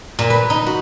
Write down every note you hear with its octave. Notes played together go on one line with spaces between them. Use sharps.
A#2
B4
D#4
F#4